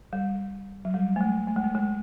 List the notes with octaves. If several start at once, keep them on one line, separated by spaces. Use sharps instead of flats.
G3
F#3
G3
A3
G#3
A3
G#3
A3
G#3